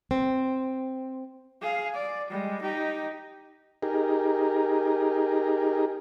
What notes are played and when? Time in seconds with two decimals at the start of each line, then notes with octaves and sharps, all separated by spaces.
0.11 C4
1.62 G#4 F5
1.95 D5
2.30 G3 G#3
2.62 D#4 G4
3.82 D#4 G4 G#4 A#4